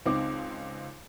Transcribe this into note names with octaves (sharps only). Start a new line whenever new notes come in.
C#2 C4 D#4 D6